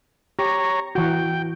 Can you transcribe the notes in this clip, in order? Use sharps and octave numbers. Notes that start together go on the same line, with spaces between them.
G4 C#5 A#5
E3 F#4 G5